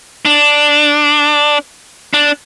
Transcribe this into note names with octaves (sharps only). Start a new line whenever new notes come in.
D4
D4